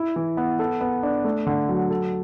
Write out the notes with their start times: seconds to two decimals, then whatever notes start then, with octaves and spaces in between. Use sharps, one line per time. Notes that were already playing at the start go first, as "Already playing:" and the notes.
Already playing: E4
0.16 E3
0.37 B3
0.59 A4
0.81 B3
1.03 D4
1.25 A3
1.47 D3
1.69 F#3
1.90 A4